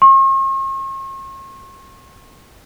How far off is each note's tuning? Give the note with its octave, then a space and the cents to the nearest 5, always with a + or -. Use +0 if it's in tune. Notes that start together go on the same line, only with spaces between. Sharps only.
C#6 -45